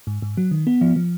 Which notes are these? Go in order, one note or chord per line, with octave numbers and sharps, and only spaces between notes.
G#2
G#2
F#3
D#3
B3
F3
F3